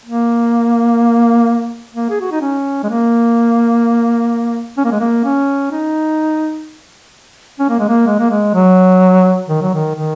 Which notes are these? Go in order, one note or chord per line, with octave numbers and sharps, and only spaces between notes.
A#3
A#3
G#4
F#4
D#4
C#4
G#3
A#3
C#4
A#3
G#3
A#3
C#4
D#4
C#4
A#3
G#3
A#3
G#3
A#3
G#3
F#3
D#3
F#3
D#3
D#3